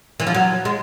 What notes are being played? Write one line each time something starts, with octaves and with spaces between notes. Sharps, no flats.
E3
F3
F#3
G#3